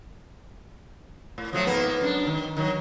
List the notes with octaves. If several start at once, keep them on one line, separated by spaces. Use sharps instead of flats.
A2
F3 F#3 A3
G#2 A#3 B3
F#2 D4
D#3
D#3 F#3